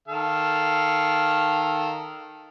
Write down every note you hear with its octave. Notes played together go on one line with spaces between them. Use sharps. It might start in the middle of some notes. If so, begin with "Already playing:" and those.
D#3 A4 F5